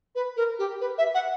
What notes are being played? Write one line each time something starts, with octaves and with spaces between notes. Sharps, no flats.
B4
A#4
G4
B4
E5
F#5